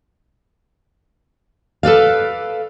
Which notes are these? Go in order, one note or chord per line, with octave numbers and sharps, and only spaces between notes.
A4 B4 D5 F5